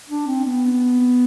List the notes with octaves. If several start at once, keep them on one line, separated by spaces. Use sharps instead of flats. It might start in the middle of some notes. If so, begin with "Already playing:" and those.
D4
C4
B3